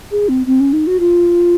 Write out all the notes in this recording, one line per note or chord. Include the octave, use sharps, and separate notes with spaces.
G#4
C4
C4
C#4
D#4
F#4
F4